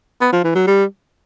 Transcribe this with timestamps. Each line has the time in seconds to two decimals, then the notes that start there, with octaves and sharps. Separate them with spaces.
0.21 B3
0.33 F3
0.44 E3
0.56 F#3
0.67 G3